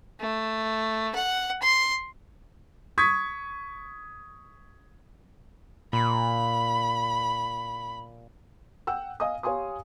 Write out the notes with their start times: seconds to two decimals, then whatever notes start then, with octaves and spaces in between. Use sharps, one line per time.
0.20 A3
1.15 F#5
1.62 C6
2.98 C#6 D#6 G#6 B6
5.93 A#2 B5
8.87 F#5 G5 E6
9.20 D#5 F5 G#5 D#6
9.43 G4 C#5 F5 G#5 C6 D#6